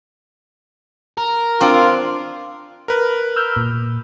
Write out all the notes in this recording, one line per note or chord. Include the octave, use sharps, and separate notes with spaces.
A#4
C4 D4 F4
A#4 B4
E6 F6 G6
A#2